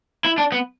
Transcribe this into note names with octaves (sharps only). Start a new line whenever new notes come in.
E4
D4
B3